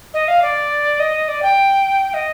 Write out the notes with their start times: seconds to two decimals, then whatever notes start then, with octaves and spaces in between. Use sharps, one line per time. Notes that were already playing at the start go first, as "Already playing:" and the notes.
0.14 D#5
0.28 F5
0.42 D5
0.99 D#5
1.28 D5
1.42 G5
2.14 D#5